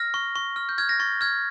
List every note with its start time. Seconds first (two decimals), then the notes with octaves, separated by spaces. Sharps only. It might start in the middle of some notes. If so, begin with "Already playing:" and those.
Already playing: F6 A#6
0.14 C#6
0.36 C#6
0.56 F6
0.69 G6
0.78 F6 G#6
0.89 A#6
1.00 C#6 A6
1.21 F6 G#6